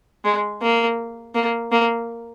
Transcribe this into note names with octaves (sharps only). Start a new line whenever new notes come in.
G#3
A#3
A#3
A#3